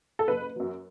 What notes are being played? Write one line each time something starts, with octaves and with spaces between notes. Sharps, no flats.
A4
F#1 B4
F#2 F#3